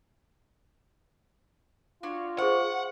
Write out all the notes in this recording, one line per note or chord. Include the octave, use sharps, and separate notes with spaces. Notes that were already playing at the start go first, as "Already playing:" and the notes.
D4 F4 F#4 C#5
G#4 C5 F#5 C#6